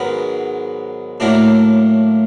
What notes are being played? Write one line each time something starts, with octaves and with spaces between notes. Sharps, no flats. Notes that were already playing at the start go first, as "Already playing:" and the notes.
Already playing: G#2 D#3 F#3 B3
A2 F#3 A#3 D4